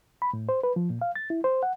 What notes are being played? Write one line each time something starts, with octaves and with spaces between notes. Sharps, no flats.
B5
A2
C5
B4
F3
A#2
F5
A6
E4
C5
F#5